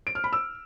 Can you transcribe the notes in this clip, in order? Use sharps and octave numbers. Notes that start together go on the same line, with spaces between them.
D7
F6
B5
E6